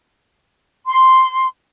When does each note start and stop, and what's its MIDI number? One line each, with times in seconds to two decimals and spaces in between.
0.86 1.46 84